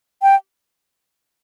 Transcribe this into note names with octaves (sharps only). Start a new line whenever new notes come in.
G5